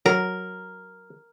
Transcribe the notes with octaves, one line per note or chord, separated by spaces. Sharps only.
F#3 A#4